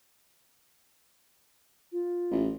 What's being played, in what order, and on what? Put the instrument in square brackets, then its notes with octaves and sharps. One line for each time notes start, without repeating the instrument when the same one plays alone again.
[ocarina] F4
[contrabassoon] A1